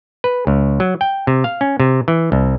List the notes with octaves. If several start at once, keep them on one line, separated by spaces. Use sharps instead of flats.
B4
C#2
F#3
G5
C3
F5
C#4
C3
E3
C2